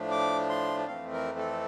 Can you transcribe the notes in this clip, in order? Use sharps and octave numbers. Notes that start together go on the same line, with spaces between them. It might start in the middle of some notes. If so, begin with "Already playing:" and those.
Already playing: A2 F3 A3 D4
D6
C6
F2 E3 A3 C4 F5
A#4
A4